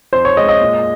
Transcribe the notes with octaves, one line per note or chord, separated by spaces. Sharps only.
F2 C5
C#5
G#3 D#5
D#5
A#2